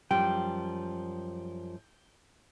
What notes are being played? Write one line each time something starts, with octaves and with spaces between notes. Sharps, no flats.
F#2 F3 G3 G5